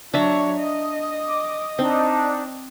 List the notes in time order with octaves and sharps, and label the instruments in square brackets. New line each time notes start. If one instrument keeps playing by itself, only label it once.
[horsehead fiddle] F#3 C#5 [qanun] D4 E5 A#5
[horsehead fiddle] D#5
[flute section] D6
[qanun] C4 [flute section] D4 D#4 A5